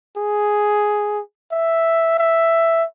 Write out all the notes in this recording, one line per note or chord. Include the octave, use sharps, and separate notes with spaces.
G#4
E5
E5